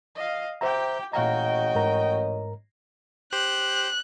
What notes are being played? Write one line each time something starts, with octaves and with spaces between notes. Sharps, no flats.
D#5 F5
G4 C5 E5 G5 A#5
A1 A#2 F#4 C#5 D#5 F5 G5 A#5
G#2 A#4 A#5
G4 C5 F#6